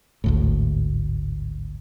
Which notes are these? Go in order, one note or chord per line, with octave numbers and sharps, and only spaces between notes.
G#1 D2 A2